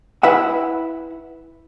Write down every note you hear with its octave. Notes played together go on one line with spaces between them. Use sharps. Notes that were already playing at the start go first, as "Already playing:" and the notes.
E4 B4 E5 F#5